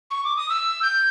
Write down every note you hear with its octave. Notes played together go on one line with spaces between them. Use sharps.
C#6
D6
D#6
E6
G6